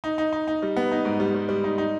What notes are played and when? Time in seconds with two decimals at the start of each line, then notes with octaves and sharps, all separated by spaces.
0.04 D#4
0.18 D#4
0.33 D#4
0.48 D#4
0.63 G3
0.77 B3
0.92 D#4
1.05 G#2
1.20 G3
1.34 G3
1.49 G3
1.64 D#4
1.78 D#4